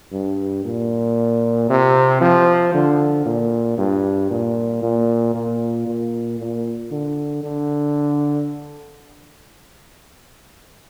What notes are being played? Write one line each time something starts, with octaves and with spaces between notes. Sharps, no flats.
G2
A#2
C3
F3
D3
A#2
G2
A#2
A#2
A#2
A#2
A#2
D3
D3